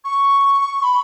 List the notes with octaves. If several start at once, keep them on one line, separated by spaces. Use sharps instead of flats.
C#6
B5